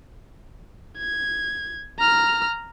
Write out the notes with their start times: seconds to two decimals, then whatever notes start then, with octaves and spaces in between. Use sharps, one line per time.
0.98 G#6
1.99 A#5 F6